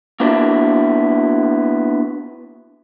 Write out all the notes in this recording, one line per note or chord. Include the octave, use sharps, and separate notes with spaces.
A#3 B3 D4 E4 F#4